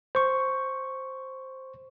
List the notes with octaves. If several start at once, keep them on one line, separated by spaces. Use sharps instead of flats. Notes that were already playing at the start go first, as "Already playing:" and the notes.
C5 C#6